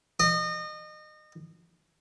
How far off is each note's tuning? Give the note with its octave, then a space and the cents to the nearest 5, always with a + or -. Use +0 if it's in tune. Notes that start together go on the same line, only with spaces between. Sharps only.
D#5 -30